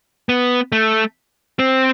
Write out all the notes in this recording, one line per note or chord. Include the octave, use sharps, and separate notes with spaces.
B3
A3
C4